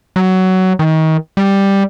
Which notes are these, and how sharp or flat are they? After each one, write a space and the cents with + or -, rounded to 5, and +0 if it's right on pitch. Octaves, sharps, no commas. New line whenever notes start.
F#3 +15
D#3 +30
G3 +5